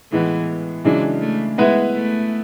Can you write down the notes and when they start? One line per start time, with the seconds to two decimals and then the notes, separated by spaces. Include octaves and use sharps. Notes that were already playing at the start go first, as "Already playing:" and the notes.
0.12 A2 E3 G#3 B3
0.85 C#3 E3 F#3 G#3 D4
1.21 A3
1.58 G#3 B3 E4 B4 E5
1.94 A3